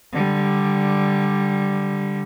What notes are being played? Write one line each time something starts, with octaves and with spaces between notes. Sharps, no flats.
D3 G3